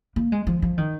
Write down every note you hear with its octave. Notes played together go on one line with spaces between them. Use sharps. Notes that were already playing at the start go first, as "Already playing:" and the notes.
A#3
G#3
F3
F3
D#3